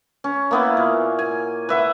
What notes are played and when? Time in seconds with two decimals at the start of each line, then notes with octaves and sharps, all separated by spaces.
0.24 C#4
0.51 A#3 B3 E4
0.77 A#2
1.19 G#5
1.69 B4 E5 F#5